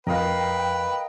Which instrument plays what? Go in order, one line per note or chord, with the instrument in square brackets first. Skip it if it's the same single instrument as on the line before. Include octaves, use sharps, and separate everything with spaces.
[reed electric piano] F2 [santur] A#4 D#5 F5 [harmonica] B4 [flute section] G5